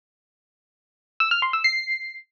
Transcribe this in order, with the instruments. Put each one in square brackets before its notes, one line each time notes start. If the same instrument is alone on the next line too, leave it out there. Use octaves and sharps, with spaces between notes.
[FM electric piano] E6
F6
C6
E6
C7